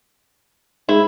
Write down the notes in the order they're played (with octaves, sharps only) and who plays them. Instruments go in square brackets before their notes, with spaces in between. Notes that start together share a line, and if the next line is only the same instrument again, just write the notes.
[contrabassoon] G#2 [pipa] E4